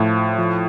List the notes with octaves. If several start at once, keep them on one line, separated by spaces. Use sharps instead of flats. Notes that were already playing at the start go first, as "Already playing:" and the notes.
Already playing: A2 F3
F3